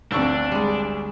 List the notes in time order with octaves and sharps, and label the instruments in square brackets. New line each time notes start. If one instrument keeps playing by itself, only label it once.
[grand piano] G1 D2 [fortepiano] C4 C#6 E6 [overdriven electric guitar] D4
[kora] G3 G#3